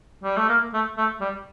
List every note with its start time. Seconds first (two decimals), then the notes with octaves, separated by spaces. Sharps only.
0.23 G3
0.37 A3
0.49 A#3
0.74 A3
0.97 A3
1.21 G3